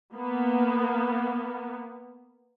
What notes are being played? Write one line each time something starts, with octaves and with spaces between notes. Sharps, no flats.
A#3 B3